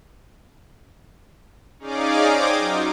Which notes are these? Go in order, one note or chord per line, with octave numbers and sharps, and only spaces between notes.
C#4 D#4 G#4 D5 F5 D6
C5 D#5 G5 D6 D#6 G#6
F#3 D#4 F4